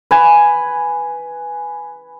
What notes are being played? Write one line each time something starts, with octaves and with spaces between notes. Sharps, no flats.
B4 G#5